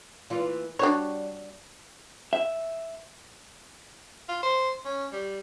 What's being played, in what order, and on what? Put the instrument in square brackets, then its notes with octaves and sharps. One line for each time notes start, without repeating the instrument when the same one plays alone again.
[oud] E3 A#3 F4
[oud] G3 [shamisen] D4 F#4 C#5
[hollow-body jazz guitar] E5
[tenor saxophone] F4
C5
C#4
G3